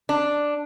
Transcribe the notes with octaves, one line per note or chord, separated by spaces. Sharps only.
D4